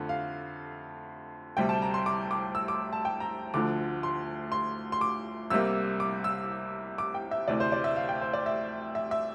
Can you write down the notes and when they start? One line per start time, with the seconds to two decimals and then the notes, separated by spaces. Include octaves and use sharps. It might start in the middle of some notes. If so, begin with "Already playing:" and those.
Already playing: F2 D3 A3
0.09 F5
1.57 D2 C3 G3 G5
1.69 A5
1.82 A#5
1.94 C6
2.06 D6
2.31 D6
2.55 E6
2.68 D6
2.93 A5
3.05 G5
3.20 A#5
3.54 D2 D3 F3 D6
4.03 C6
4.52 C6
4.92 C6
5.01 D6
5.50 C2 C3 G3 A#3 E6
6.00 D6
6.24 E6
6.98 D6
7.14 G5
7.31 E5
7.48 D2 C3 E3 D5
7.60 C5
7.72 D5
7.84 E5
7.96 F5
8.09 G5
8.21 C5
8.34 D5
8.46 E5
8.95 E5
9.11 E5